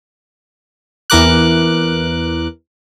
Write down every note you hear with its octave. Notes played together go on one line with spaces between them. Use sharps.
E2 E3 A#4 D6 F#6